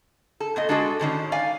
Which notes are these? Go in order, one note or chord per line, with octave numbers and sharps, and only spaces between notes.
A4
A#2 B3 D#5
G#3 D4 F#4 G#4 A4
A2 D#3 C#4 D4
D5 F5 G#5